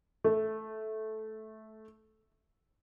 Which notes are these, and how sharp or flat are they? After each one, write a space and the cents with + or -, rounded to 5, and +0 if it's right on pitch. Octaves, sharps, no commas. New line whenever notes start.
A3 -10